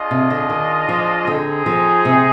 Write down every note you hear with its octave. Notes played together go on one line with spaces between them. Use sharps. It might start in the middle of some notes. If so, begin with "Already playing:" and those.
Already playing: D4 F4 G#4 D#5
C3
D3
D#3
F3
D3 C4 D#4 G#4
F3
C3